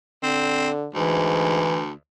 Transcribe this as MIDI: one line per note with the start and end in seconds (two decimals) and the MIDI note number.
0.23 0.88 50
0.23 0.70 60
0.95 1.92 38
0.95 1.66 44
0.95 1.80 52